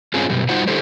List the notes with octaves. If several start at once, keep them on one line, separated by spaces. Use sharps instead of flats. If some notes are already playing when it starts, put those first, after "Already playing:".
G2 C4 C#4 F4 G#4
F#2 B2 G3
G3 D#4 F4 F#4 C5 F#5
D3 G3 E4 G4 A4 C5